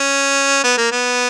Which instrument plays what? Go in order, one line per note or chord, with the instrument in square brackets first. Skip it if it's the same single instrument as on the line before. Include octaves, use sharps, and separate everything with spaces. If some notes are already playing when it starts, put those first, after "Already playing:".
Already playing: [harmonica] C#4
B3
A#3
B3